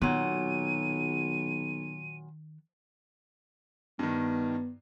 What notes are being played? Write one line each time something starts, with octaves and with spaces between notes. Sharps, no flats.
B1 A#2 D#3 F#3 B3 D#7
G2 D#3 B3